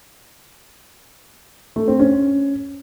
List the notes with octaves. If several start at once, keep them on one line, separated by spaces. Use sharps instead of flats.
A3
C4
C#4